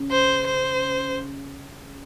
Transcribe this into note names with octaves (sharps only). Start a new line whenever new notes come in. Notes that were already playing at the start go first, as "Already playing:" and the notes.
Already playing: C#3
C5
C5